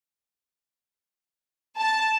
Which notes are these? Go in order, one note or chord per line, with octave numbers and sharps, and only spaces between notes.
A5